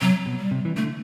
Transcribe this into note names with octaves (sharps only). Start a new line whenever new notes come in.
C3 F#3
B2
G3
C3
E3
D3 A3